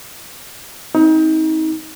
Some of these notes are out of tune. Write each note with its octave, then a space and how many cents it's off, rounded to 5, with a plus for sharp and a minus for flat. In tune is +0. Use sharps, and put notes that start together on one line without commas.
C4 +5 D#4 +30